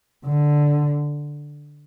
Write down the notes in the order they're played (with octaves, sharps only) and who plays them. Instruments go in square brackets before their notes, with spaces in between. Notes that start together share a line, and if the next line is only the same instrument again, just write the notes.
[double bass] D3